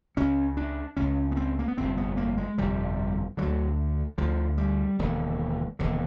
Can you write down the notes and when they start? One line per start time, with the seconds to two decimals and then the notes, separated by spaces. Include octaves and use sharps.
0.17 C#2 C#3 C#4
0.57 D4
0.97 C#2 C#3 C#4
1.31 B3
1.37 C4
1.59 A#3
1.68 B3
1.77 G1 F2 C3 C4
1.97 B3
2.17 A#3
2.37 G#3
2.58 G1 F2 C3 G3
3.37 D2 D3 F#3
4.18 D2 D3 F3
4.58 G3
4.99 E1 D#2 D3
5.79 E1 D#2 D3